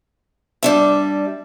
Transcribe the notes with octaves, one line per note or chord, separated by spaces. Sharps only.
G3 D4 E5